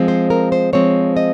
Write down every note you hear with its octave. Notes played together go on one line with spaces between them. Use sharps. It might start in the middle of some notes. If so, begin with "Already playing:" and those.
Already playing: F3 G#3 C4
C5
A#4
C5
F3 G#3 C4 C#5
D#5